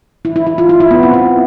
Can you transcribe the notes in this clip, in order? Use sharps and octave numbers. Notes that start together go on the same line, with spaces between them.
E4
E4
E4
F4
E4
E4
B3
C4
E4